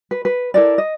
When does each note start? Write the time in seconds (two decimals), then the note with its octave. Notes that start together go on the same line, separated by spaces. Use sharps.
0.11 B4
0.25 B4
0.54 E4 A4 A#4 D5
0.78 D#5